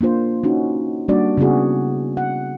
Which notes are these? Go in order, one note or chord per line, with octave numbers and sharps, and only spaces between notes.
A#3 D4 F4 C5
C#4 D#4 F#4
G3 A#3 D4 F#4 D5
C#3 B3 E4 F#4 G#4
F#5